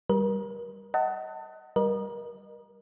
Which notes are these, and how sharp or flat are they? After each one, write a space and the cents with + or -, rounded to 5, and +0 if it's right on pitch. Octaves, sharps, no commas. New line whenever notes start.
G3 +0 A#4 +35
D#5 +25 F#5 +20 A5 +25
G3 +0 A#4 +30 D#5 -35